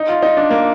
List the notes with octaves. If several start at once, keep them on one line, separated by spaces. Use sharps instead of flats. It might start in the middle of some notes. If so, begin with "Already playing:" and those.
Already playing: D#4
F4
D#4
D4
A#3